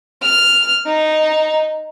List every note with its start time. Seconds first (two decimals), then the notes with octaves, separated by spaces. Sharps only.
0.22 F6
0.86 D#4